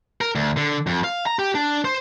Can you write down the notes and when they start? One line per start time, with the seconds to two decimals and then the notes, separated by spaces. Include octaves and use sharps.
0.21 A#4
0.35 D2
0.57 D3
0.87 F2
1.04 F5
1.26 A#5
1.39 G4
1.55 D4
1.85 C5